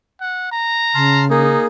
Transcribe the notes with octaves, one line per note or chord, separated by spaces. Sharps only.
F#5
A#5
C#3 A5 C6 F6
A#3 D#4 G#4